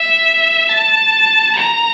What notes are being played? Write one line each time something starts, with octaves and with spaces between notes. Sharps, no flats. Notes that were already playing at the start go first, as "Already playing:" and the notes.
Already playing: E5
A5
A#5